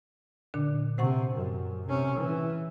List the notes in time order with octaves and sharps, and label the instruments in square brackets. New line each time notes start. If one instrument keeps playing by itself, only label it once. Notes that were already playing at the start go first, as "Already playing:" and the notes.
[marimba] A#2 D3 D4
[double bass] C3 [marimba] C5 F#5 C#6
[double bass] F#2
C3 C#4
E3